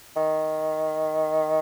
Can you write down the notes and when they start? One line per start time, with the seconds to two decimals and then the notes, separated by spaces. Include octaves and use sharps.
0.17 D#3